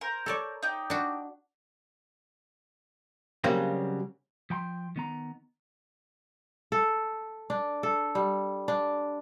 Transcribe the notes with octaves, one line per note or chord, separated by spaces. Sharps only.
A#4 C5
A4 C#5 D5
D#4 G4
D4 F#4
C#3 F#3 G3 A#3 C4
F3 G5 A#5 C6
D#3 B3 A#5
A4
D4
A4
G3
D4